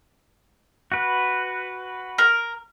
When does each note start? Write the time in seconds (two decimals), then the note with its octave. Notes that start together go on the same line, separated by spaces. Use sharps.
0.92 F#4 B4
2.18 A#4